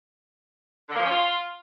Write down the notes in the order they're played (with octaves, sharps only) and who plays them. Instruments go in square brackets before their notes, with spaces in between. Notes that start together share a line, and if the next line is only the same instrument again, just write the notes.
[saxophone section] D3
A#3
F3
C#4
F4